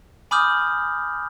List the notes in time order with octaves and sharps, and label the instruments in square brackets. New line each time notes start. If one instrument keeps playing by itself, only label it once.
[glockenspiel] G#5 B5 D6 D#6 F6 G6